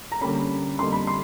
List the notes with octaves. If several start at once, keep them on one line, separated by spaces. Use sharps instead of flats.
A#5
D3 G3 A#3 C#4 B5
F2 D3 G3 A#3 D#4 C6
B5
C6